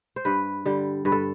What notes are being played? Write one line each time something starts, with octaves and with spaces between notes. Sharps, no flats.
C5
G2 B4
D3 G3
G2 B4
A4